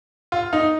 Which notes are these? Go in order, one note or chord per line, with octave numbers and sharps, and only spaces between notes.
F4
D#4